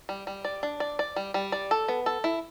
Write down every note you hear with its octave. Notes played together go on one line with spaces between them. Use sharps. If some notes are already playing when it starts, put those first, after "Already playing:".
G3
G3
D5
D4
D5
D5
G3
G3
D5
A4
B3
A4
E4